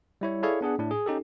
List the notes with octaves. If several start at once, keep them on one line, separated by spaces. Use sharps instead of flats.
G3 E4 C#5
E4 G#4 A4 C#5 D5 F5
B3 D4 G#4 F#5
A2 D4
G#4
C#4 D#4 G4 A4